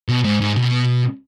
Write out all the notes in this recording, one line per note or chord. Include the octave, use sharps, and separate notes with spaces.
B2
G#2
G#2
B2